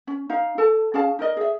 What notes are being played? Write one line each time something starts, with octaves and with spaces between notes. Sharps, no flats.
C#4
D#4 F5
A4 A5
C#4 G#4 F5 A5
D#4 A#4 D#5
G#4 E5